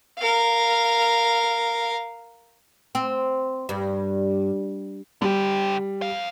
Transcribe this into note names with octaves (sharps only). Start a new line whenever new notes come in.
A#4 F5
C4
G2
D3 G3 G4
F2 F5